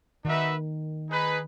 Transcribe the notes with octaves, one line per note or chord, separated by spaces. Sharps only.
D#3 D#4 F#4 B4 E5
D#4 G#4 B4